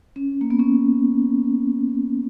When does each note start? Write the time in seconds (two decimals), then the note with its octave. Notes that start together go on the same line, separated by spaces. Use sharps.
0.16 C#4
0.41 A#3
0.50 B3
0.59 C#4